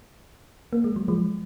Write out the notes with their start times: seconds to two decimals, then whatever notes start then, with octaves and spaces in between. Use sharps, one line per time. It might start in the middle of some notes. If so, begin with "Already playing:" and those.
0.73 A#3
0.84 G#3
0.96 F#3
1.08 F3 G#3